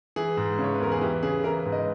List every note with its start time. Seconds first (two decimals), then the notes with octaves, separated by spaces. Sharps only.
0.16 E3 G#4
0.37 G#2
0.59 C#3
0.64 C#5
0.74 B4
0.80 E2 A#4
0.92 G#4
1.01 E3 G4
1.23 C#3 G#4
1.44 E3 A#4
1.59 B4
1.65 G#2
1.72 D#5